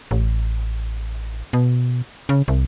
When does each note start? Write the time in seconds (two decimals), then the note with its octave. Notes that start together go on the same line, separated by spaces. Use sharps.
0.11 A1
1.53 B2
2.29 C#3
2.48 C2